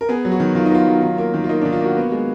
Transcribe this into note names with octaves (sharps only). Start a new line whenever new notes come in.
A#4
B3 G#4
F#3
F#4
D#3
D#3 F4
D#4
B3 F4
F#3
D#3
A#3
D#3
F4
A#3 D#4
D#3 D4
F4
A#3 F#4
B3
G#3